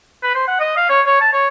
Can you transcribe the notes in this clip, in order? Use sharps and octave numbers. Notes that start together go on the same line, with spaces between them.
B4
C5
F#5
D#5
F5
C#5
C#5
A5
C#5